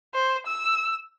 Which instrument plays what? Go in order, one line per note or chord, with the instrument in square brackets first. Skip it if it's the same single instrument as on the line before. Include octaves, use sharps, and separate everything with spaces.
[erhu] C5
E6